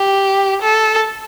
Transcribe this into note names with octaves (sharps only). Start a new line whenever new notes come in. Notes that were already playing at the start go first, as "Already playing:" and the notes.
Already playing: G4
A4